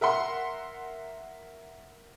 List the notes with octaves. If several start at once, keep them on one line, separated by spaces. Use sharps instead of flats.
A#4 E5 F#5 C6